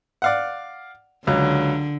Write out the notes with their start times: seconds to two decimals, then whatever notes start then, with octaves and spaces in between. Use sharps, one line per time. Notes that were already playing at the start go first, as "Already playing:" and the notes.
0.22 D5 F5 F#5
1.27 C#2 D3 F#3